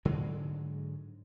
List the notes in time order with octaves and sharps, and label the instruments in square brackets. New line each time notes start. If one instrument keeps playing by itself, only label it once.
[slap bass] G#2 D3 F#3 G#3